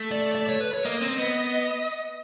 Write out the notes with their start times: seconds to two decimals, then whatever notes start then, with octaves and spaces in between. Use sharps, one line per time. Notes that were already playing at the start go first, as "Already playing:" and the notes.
Already playing: A3
0.12 D5
0.35 D5
0.49 C#5
0.61 B4
0.74 C#5
0.85 A#3 D#5
1.02 C4
1.18 B3